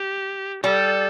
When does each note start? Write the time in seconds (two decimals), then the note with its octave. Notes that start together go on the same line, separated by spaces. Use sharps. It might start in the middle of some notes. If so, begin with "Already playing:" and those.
Already playing: G4
0.63 G3 A4